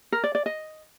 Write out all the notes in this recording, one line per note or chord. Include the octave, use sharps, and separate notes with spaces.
A#4
D5
D5
D#5